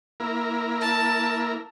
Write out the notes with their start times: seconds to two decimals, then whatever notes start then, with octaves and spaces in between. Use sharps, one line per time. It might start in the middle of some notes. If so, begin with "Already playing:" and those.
0.20 A#3 E4 A#4
0.81 A5